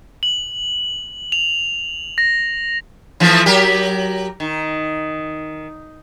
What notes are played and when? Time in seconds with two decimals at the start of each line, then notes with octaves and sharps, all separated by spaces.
0.23 F#7
1.32 F7
2.18 A#6
3.20 E3 F3 A3
3.46 F#3 G4 A#4
4.40 D#3